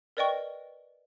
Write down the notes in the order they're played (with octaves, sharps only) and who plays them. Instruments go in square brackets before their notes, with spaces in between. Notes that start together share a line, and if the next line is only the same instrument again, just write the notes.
[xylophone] A#4 B4 D5 D#5 G5 C#6